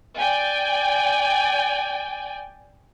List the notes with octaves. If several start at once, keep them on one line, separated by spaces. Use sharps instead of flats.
D5 G5 G#5